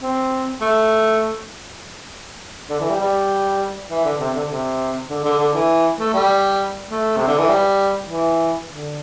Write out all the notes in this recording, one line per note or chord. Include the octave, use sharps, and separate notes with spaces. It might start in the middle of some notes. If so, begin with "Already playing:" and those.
C4
A3
D3
E3
G3
G3
E3
D3
C3
D3
C3
D3
D3
D3
E3
A3
G3
A3
C3
D3
E3
G3
E3
D3